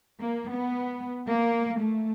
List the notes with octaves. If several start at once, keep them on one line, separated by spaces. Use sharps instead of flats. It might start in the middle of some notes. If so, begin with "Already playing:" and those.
A#3
B3
A#3
A3